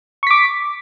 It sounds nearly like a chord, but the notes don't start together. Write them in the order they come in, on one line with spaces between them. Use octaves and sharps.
C#6 B6 D6